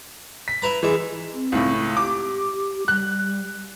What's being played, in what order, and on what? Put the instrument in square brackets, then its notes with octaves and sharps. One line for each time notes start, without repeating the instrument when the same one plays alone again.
[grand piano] B6
[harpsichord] E4 B4 A#5
[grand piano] E3 [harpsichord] G#3 E5
[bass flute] C4
[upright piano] C#2 A2
[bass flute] G4 [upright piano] D6
[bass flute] G3 [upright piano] F#6